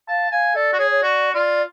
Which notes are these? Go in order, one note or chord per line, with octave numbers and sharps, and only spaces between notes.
F5 A5
F5 G#5
A4 D5
F#4
G#4 C#5
C#5
F#4 D5
F4 D5